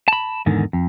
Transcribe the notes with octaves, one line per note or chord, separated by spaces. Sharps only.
A5 B5
E2 G#2 D3 D#3
F2